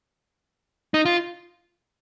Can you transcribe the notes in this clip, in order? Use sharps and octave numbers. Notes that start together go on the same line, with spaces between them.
D#4
F4